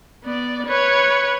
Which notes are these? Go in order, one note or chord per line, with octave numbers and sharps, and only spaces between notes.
B3 D5
B4 C#5